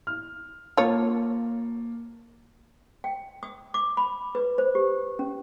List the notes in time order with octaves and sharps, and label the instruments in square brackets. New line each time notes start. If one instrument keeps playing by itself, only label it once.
[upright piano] F6
[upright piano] A#3 A5 [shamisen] F4 C#5
[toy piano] G5
D#6
D6
B5
B4
C5
G4
C#4